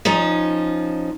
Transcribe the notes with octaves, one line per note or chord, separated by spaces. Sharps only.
F3 C#4 D#4